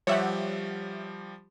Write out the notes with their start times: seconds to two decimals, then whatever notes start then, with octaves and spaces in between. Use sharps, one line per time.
0.07 F3 G3 G4 C#5 E5 F#5